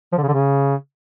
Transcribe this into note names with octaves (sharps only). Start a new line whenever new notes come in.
F3
D3
C#3
D3
C#3